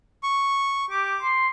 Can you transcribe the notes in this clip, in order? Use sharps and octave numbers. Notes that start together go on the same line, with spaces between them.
C#6
G4 D6
C6